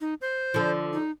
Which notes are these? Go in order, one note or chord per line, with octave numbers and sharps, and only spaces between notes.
D#4
C5
D3 F3
D#4